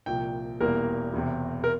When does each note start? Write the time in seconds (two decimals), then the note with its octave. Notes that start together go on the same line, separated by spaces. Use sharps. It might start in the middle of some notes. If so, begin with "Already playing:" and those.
0.06 C2 A#2 F3 G5
0.60 E1 E2 E3 G3 A#3 A#4
1.14 E1 E2 C3
1.64 A#4